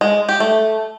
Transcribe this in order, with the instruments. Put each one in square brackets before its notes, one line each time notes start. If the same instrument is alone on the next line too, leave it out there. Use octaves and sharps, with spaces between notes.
[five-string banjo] G#3
G4
A3